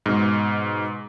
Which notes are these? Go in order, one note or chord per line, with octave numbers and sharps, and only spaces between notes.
G#2 B2